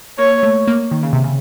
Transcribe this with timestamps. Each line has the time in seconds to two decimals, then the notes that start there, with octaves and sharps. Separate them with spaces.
0.18 A#3 C#5
0.43 A3
0.67 A#3
0.91 D#3
1.03 C#3
1.13 C3
1.24 C#3